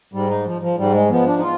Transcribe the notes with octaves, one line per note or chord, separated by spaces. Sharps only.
G#2 G3
D#4
F3
F3
G#2 G3
G#3
F3 B3
D4
D#4
F4